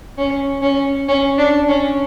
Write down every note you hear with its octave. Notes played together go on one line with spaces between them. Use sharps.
C#4
C#4
C#4
D4
C#4